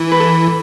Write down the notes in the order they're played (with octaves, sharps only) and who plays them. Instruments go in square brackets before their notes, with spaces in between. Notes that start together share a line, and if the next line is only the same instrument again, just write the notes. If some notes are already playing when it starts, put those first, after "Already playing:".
Already playing: [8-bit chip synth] E3
[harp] B4
A4